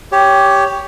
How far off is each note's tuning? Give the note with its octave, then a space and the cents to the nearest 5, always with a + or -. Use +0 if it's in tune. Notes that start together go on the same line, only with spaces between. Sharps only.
G4 +0 C#5 +15